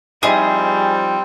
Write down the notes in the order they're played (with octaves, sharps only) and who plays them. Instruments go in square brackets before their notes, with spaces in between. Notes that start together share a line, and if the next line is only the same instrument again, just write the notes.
[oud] F3 D#4 E4 [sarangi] G3 [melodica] C4 [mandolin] G#4